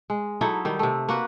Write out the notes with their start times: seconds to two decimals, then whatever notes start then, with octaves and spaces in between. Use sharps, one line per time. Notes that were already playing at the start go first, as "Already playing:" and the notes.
0.10 G#3
0.41 F#3 D#4 E4 A4
0.65 D#3 G3
0.79 C3 A3
1.09 A#3 F#4 B4